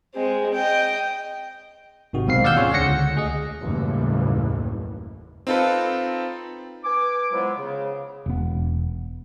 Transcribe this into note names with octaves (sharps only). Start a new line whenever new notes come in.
G#3 C4
D#5 G5
G#1 C3 D#3 F#4
B1 G#2 B2 C4 F5 C7
D#2 D5 F5 F#5 E6 G6
C#4 F4 G#4 C#5
C#2 D3 F#5 A#6 C#7
D2 G#4 D#5
F#1 D#2 A2 E3 F#3 G3
C4 D#4 F4 A4 B4
B4 G#5 D6
F3 F#3 G#3 B3 E4
C#3
E1 B3